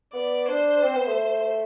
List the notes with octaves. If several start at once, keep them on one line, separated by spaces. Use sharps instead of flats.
B3 D5
D4 C5
C4
B3
A3